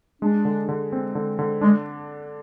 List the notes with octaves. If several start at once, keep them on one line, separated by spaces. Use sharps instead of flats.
G#3 D4
D3
D3
C4
D3
D3
G#3 D4